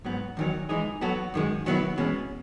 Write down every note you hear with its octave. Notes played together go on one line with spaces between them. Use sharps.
G#2 F#3 B3
E2 D#3 F#3
E3 G#3 D#4 G#4
F#3 B3 F#4 A4
F#2 D#3 G#3
D#3 F#3 B3 E4
E2 B2 G#3 C#4